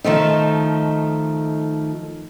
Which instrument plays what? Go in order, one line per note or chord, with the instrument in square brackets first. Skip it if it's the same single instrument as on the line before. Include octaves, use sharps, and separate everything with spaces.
[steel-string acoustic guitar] D#3 F3 A3 D#4